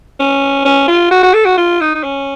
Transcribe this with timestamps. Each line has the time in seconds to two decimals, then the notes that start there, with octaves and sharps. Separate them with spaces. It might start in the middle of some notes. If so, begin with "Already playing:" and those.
0.20 C#4
0.65 C#4
0.88 F4
1.11 F#4
1.23 F#4
1.34 A4
1.45 F#4
1.57 F4
1.81 D#4
1.95 D#4
2.03 C#4